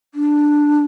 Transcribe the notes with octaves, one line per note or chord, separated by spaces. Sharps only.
D4